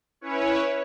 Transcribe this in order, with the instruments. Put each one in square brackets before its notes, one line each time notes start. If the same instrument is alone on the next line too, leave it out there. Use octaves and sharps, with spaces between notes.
[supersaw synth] C#4 E4 B4 C#5